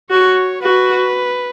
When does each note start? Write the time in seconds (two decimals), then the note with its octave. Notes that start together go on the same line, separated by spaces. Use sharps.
0.11 F#4 C#5
0.62 F#4 B4